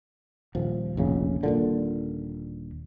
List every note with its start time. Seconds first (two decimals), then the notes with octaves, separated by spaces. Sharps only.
0.55 D#1 F3
0.97 F1 A#1 C#3
1.43 D#1 A#2 D3